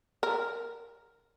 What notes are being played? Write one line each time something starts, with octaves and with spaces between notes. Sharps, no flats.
A#4